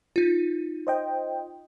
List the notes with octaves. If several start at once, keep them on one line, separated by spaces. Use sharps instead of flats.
D#4 F4
C5 D#5 G5